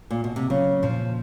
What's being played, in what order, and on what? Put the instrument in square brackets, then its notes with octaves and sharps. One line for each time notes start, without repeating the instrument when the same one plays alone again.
[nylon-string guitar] A#2
B2
C3
[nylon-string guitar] C#3 [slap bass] F#3
[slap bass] A#2 [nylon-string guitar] F3